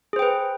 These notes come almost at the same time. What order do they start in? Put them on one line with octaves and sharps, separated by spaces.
G#4 C5 G5 B4